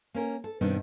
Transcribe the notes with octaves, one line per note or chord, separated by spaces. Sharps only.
A#3 C#4 A#4
A4
G2 B2 D#3 G3 C4 D4